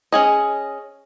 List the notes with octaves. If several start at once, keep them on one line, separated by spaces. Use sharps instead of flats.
C#4 G#4 D#5